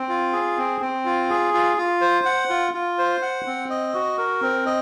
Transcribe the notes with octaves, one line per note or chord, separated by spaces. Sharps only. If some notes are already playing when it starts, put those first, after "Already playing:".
Already playing: C4
F4
G#4
C4
C4
F4
G#4
F4
F4
C5
F#5
F4
F4
C5
F#5
C4
D#5
F#4
A#4
C4
D#5